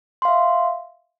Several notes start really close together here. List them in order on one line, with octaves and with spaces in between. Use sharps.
C6 F5 E5